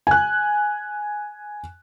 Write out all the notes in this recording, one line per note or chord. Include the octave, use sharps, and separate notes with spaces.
G#5 F#6